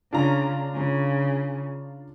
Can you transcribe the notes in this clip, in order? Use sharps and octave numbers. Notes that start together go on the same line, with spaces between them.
C#3 D4 F4 A#5
C#3